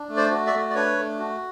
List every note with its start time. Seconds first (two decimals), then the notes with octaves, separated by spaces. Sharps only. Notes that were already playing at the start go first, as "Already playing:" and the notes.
Already playing: D4
0.09 A3
0.17 C5 D5
0.31 F#4
0.46 D5 E5
0.53 A3
0.70 D5
0.75 D4 B4 C#5
0.98 A3
1.19 F#4